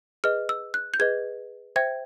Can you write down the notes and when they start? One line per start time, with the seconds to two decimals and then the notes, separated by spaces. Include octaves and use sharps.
0.24 G#4 B4 D#5 F6
0.49 E6
0.74 F#6
0.94 G6
1.00 G#4 B4 D#5 G#6
1.76 C5 E5 G5 G#6